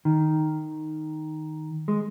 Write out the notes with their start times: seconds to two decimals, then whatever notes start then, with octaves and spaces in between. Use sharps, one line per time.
0.05 D#3
1.88 G#3